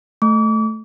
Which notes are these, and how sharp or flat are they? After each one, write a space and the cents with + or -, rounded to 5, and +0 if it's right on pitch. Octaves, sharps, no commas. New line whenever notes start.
A3 -5 D6 -40